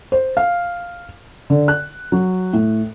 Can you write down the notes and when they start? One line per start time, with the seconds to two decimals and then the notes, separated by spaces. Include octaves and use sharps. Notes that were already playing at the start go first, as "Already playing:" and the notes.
0.12 C5
0.37 F5
1.50 D3
1.68 F#6
2.12 F#3
2.53 A2